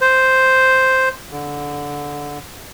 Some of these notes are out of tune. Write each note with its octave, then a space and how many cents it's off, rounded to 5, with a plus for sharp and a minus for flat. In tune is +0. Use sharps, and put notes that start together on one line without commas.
C5 +0
D3 -15